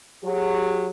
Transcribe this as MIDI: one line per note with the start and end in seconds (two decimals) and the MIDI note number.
0.24 0.90 54
0.24 0.90 67
0.24 0.90 68